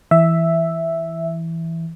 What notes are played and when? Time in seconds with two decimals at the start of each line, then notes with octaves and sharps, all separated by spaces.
0.11 E3 E5